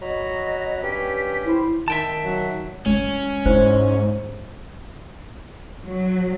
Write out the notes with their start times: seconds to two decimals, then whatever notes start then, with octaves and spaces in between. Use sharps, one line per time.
0.01 F#3 F#4 D#5 A#5 B5
0.83 G2 C#4 G4 G5 B6
1.46 E4 C5
1.88 D#3 E5 G5 A5
2.25 F#3
2.86 G#3 C#4 E4
3.46 G#2 E4 C5
5.86 F#3